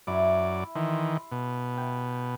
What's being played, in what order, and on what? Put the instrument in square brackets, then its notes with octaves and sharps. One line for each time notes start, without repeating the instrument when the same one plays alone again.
[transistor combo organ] F#2 D5 [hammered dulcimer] E4
[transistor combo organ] D#3 E3 [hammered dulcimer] C6
[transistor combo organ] B2
[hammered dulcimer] G5